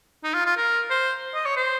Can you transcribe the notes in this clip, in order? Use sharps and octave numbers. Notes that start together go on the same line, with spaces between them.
D#4
F4
F4
A#4
C5
D#5
C#5
C5